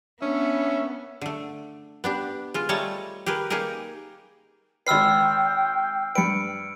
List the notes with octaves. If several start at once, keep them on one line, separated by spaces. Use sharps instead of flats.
B3 C#4 D4 E5
D3 A3
B3 D4 G4
G#3 F4
G3 A3 C#5 D#5 A5 A#5
G4 G#4 A#4 B4
A#3 D#4 G4 G#4 A#4
G#1 B4 G5 E6 F6 C7
G2 B4 C#7 D7